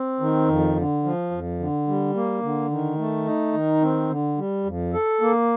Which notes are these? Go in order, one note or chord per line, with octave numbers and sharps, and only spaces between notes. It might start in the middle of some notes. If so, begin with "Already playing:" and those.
Already playing: C4
D#3
F2
D3
F3
F2
D3
G3
A#3
D3
D#3
A3
D#4
D#3
C4
D3
G3
F2
A4
A#3